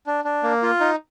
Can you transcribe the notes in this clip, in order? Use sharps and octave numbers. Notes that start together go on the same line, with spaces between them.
D4
D4
A#3
F4
D#4